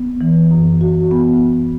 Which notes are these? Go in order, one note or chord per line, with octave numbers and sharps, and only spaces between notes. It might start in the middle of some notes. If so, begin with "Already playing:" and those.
Already playing: B3
E3
F#2
F#4
B3